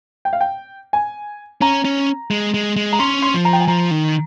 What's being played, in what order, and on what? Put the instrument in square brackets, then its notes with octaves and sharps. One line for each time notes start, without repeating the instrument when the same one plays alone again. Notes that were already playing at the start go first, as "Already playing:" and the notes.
[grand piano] G5
F5
G5
G#5
[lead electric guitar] C#4 [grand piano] A#5
[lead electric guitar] C#4
G#3
G#3
G#3
[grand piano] A#5
[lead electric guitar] C#4 [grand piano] C6
[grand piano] C6
[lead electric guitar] F3
[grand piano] A#5
G5
G#5
[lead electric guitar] F3 [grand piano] A#5
[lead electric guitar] D#3